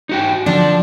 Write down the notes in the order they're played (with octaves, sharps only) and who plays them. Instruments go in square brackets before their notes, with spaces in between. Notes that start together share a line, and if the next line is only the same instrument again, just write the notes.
[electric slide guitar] D#4 F#4 G5
[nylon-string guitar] D3 F3 [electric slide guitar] D4